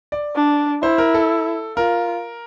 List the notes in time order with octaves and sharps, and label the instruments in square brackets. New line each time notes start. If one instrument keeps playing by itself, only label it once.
[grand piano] D5
[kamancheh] D4
[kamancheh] E4 [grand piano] C5
[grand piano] A#4
A4
[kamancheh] F4 [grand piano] A#4